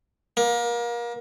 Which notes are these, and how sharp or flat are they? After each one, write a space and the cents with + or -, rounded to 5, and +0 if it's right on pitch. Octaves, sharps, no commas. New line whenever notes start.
A#3 +30